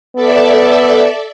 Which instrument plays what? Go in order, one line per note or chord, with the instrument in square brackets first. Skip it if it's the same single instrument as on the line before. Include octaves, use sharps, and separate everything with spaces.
[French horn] B3 [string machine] A4 D5 E5